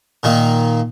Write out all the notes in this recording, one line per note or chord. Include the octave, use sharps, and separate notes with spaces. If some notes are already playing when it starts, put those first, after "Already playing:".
A#2 D#3 A#3